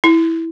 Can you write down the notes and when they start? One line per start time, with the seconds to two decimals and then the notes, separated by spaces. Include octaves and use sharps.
0.04 E4